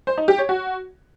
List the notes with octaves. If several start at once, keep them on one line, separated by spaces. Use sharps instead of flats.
C5
D#4
G4
C#5
F#4